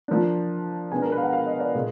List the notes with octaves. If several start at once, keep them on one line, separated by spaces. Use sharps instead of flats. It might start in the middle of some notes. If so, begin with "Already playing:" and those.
F3 A#3 D4
B2 G#3 B3 D4 G#5
A#4
B4
F5
F#5
F5
D#5
D5
A#2 G#3